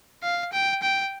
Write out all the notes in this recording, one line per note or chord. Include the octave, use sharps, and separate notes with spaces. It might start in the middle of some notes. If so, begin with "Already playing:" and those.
F5
G5
G5